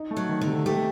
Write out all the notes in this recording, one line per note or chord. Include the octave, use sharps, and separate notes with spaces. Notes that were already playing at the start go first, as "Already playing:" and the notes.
Already playing: D#4
A3
F#3
D#3
D3
C3
A3 G4